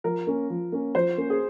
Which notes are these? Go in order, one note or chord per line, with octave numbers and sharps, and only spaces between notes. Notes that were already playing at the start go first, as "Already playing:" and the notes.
F3 A#4
A#3 C#4
F3
A#3 C#4
F3 C5
A#3 C#4
G#4